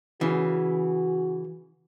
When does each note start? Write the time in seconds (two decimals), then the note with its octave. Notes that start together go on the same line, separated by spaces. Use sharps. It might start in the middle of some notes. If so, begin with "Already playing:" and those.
0.21 C#3 E3 F#4